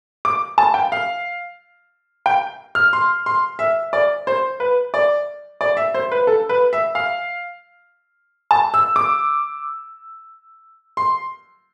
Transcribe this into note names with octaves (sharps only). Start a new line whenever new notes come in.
D6
A5
G5
F5
G5
F6
C6
C6
E5
D5
C5
B4
D5
D5
E5
C5
B4
A4
B4
E5
F5
A5
E6
D6
C6